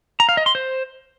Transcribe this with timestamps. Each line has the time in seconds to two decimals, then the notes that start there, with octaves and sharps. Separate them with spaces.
0.20 A#5
0.29 F5
0.37 D#5
0.46 C6
0.55 C5